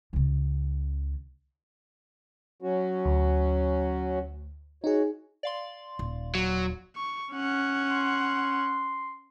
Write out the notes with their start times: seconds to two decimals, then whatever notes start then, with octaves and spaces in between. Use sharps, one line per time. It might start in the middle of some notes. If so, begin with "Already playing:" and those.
0.13 C#2 C#3
2.62 F#3 C#4 F#4
3.05 D2
4.84 D#4 F#4 G#4 C#5
5.43 D5 F5 C6
5.99 D#1
6.35 F#3
6.96 C#6
7.33 C#4 F#5
7.91 C6